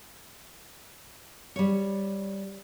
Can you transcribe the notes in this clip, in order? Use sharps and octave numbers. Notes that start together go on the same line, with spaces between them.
G3 C#5